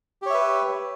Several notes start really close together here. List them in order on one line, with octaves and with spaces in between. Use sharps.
G4 C#5 E5 B4